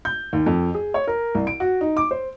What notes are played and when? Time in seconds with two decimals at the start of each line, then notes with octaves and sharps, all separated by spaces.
0.05 G6
0.33 D#2
0.46 F2
0.75 G#4
0.94 C#5
1.07 A#4
1.35 C2
1.47 D7
1.60 F#4
1.81 D#4
1.97 D6
2.11 C5